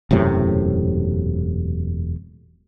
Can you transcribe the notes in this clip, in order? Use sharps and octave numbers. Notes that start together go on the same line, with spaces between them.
E1 F#2 A2 C3